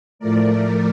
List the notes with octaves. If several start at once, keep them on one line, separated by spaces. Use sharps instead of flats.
A2 F3 A3 A#4 D5